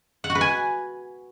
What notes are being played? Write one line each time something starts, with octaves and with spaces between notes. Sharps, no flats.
F#5
F#4
B4
G#5